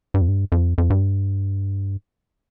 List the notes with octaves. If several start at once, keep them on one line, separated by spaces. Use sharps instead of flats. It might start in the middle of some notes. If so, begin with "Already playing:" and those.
G2
F2
G2
F2
F2
G2